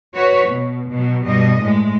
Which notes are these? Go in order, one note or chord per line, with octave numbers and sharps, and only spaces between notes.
F#4 B4 C#5
B2
B2 F#3
G2 B2 G3 D#5
A2 G#3